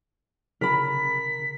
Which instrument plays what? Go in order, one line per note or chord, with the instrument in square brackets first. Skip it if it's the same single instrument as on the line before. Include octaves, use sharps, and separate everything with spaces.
[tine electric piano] C#3 [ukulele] A#4 B5 [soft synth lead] B6